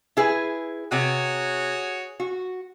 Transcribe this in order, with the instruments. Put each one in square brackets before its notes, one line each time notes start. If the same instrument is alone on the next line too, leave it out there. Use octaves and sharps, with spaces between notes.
[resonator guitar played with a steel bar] E4 G#4 B4
[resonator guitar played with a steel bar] C3 [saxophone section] F#4 G#4 C#5
[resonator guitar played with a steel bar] F#4